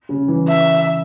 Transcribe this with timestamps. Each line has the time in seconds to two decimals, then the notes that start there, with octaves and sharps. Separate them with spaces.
0.09 C#3
0.28 E3
0.48 E5